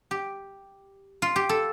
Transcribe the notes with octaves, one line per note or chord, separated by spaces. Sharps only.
G4
F4
G4
A4